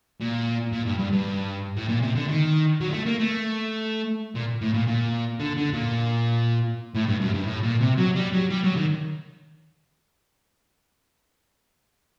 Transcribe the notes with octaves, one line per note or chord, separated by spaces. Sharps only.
A#2
A#2
G2
G2
G2
A2
A#2
C3
D3
D#3
F#3
G3
A3
A#3
A3
A#2
A2
A#2
A#2
D3
D3
A#2
A2
G2
F#2
G2
A2
A#2
C3
F#3
G3
F#3
G3
F#3
D#3